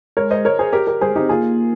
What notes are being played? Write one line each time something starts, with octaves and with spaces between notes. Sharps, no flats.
G#3 A#4 C#5
C5 D#5
A#4 C#5
G#4 C5
G4 A#4
G4 A#4
G3 G#4 C5
G#3
C4 D#4 G4
A#3 F4 G#4